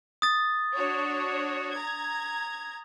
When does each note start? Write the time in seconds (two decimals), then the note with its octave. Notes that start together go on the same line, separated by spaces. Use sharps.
0.22 D#6 A6
0.74 D4 F#4 C#5
1.74 A#5 G#6